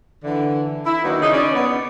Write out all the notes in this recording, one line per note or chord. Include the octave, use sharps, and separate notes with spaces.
D3 E3
E4
D#3 F#3 A#3 B3 D4 D#4
C#3 E3 D4 D#4
C#4 D5
B3